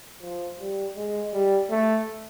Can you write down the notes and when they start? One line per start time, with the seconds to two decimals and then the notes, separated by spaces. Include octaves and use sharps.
0.22 F3
0.60 G3
0.96 G#3
1.33 G3
1.70 A3